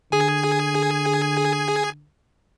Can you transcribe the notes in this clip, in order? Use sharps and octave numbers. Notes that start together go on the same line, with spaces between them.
D3 G#4 G#5